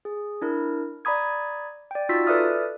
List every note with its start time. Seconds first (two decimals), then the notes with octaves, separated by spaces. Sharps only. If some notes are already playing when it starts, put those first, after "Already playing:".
0.05 G#4
0.42 D4 E4 A#4
1.05 D5 A#5 B5 D#6 G#6
1.91 D5 G5
2.09 D#4 F4 F#4 E6 A6 B6
2.27 A4 B4 D5 E5 D#6 F6